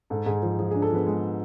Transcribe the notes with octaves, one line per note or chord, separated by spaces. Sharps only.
G#2 A4
G#2 G#4
F3 G#4
F3 G#4
D4 G#4
A4
F3 B3 B4
G#3